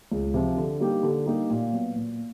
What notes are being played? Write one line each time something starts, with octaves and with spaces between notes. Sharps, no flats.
C#2
C3 F3
D3
G3 A#3 D#4 G4
D3
G3 A#3 D#4 G4
A#2
F#3 B3
A#2